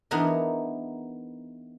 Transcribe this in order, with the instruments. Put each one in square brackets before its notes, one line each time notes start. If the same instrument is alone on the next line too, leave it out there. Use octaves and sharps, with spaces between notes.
[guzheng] E3 B3 D4 D#4 G#4 A#4